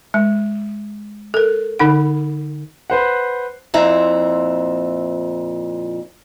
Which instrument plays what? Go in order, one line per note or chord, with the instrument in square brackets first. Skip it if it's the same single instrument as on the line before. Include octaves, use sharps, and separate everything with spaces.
[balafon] G#3
A4 A#4
D3 D#4 F#5
[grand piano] B4 C5 F#5
[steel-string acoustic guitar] F2 A#2 C4 E4 E5 A#5